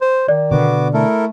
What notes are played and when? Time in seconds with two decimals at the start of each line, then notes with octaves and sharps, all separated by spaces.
0.01 C5
0.28 D#3 D5
0.51 B2 D3 B3 F#4 D6
0.94 A3 E4 A4 A#4